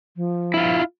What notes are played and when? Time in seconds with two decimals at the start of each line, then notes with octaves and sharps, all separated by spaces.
0.16 F3
0.54 E4 F4